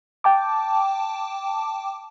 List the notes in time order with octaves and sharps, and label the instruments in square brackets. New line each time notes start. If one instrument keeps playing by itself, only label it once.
[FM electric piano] G5 A5 D6